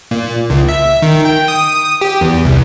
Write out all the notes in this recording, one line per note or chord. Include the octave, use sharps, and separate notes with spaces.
A#2
C#2
E5
D#3
G5
D#6
G4
E2
C2